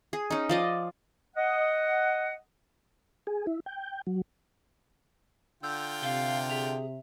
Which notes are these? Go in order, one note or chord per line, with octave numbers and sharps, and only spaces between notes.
G#4
C#4 D#4
F3 D5 D#5
D#5 F#5
G#4
E4
G5
F#3
D3 F4 G5 E6 G6
C3 F5 G7
G#4 E5 F7